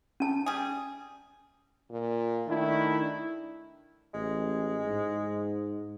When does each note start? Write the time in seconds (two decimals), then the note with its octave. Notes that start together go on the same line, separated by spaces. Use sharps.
0.20 C#4 A5
0.46 G3 G#4
1.91 A#2
2.48 D#3 A3 D4 E4
4.14 A1 G#3
4.86 G#2